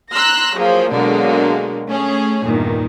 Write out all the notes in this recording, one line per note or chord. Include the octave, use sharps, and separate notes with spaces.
A#5 C6 E6 F#6 A#6
F3 F#3 A#3 G#4
B2 D3 F#3 G#3 A#3
A3 C#4 G#4
E2 G2 A#2 D#3